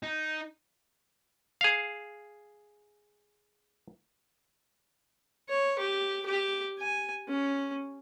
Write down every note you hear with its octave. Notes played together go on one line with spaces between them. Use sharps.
D#4
G#4 F5
C#5
G4
G4
G#5
C#4